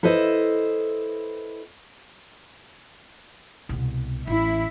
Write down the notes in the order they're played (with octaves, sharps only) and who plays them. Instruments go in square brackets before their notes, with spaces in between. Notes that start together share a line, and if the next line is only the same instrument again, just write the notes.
[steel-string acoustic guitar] E4 A4 B4 C5 D#5
[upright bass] C2 B2
[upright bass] A1 [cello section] E4